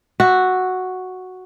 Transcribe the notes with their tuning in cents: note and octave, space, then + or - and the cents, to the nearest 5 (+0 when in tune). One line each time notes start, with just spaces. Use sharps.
F#4 +0 E5 +0